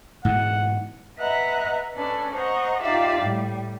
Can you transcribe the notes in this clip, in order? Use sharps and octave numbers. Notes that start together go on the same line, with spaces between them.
G#2 B2 E3 F#5
B4 D#5 E5 F#5 A#5 F#6
C#4 D4 A4 B4 D5
C5 D#5 F#5 A#5 C#6
D#4 F4 G4 D5 E5 F5
A2 G3